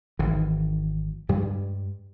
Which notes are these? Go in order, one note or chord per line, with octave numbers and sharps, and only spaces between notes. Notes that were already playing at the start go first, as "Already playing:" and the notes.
G#1 D#3 E3
G2 G3 G#3